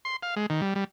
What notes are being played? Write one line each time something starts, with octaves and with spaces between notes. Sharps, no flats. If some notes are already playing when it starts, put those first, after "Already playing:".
C6
F5
G#3
D#3
G3
G3